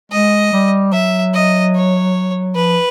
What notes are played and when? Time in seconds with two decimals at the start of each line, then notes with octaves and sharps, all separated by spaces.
0.12 G#3 D#5
0.53 G3
0.93 F#3 E5
1.34 D#5
1.75 C#5
2.55 F3 B4